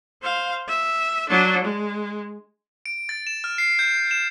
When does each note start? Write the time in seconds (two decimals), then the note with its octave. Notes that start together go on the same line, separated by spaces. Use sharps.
0.23 C5 F5
0.68 E5
1.29 F#3 D4
1.64 G#3
2.86 D7
3.09 A6
3.27 E7
3.44 F6
3.58 C7
3.79 G6
4.11 E7